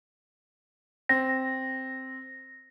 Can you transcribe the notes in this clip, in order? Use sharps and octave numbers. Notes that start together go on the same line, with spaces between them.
C4 A#6